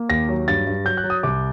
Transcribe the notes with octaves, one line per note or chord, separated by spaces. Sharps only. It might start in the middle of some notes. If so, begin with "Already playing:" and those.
Already playing: A#3
D#2 A#6
F#3
G2 A6
G2
F#3 G6
F#6
F#3
D#6
C2 D6